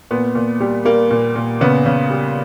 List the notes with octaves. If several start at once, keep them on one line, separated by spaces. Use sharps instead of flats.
A#2 B3
A#2
G3
G3 A#3
A#2
A#2
C#3 B3
C#3
G3